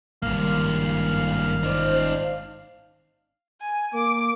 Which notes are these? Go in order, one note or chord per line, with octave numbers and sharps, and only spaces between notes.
G#1 G2 A#3 F5 F6
D#4 C5 D5
G#5
A#3 D6